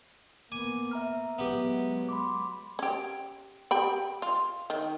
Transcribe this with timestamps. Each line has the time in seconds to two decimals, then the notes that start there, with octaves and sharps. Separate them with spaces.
0.52 A#3 B3 G#5 D6
0.91 E5 A#5 F6
1.38 F#3 G#3 B3 G4
2.09 B5 C6 D6
2.79 C#4 G4
3.71 G4 G5 B5
4.22 F4
4.70 D#3